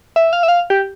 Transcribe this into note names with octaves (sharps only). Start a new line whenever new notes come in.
E5
F5
E5
F5
G4